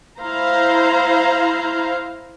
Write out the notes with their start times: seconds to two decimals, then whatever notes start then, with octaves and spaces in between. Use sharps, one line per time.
0.20 E4 C5 F5 A#5